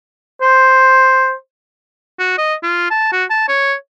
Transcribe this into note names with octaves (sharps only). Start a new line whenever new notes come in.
C5
F#4
D#5
F4
A5
F#4
A5
C#5